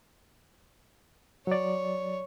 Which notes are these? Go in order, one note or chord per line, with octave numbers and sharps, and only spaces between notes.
F#3 C#5 D5